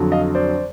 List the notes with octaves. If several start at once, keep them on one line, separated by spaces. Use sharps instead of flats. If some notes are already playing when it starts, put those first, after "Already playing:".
Already playing: F2 D3 F#3
D#5 F5
C5 D5